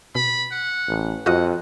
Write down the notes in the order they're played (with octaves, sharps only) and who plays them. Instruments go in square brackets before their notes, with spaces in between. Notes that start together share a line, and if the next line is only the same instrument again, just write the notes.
[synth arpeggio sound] B2 [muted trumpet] B5
[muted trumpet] F#5
[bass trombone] A1
[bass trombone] F2 [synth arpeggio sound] F4 F#4 D#5 [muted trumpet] F#5